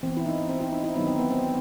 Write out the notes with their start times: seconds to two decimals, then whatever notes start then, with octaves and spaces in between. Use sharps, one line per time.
0.03 E3 B3 C4
0.17 E4
0.26 D#4
0.49 C4
0.61 E4
0.72 D#4
0.84 E4
0.96 D#3 F#3 B3 D#4
1.07 C4
1.19 B3
1.30 C4